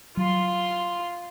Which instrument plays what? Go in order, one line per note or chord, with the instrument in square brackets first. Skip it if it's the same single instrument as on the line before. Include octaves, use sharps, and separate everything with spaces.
[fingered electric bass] F#3 [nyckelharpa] F4 C6